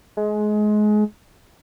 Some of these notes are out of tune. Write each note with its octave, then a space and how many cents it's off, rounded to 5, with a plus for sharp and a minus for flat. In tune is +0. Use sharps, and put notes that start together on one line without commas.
G#3 +25